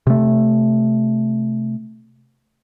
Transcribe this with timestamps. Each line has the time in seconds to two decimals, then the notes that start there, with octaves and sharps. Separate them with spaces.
0.07 C3 A3